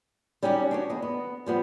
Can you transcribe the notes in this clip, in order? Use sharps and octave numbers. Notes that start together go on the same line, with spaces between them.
G3 C#4 D#4 F#4 G4
D4 F#4 C#5
E2 D#5
B3
F3 G3 B3